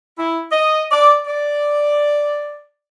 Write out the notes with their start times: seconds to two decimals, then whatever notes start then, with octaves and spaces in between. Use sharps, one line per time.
0.18 E4
0.52 D#5
0.91 D5
1.26 D5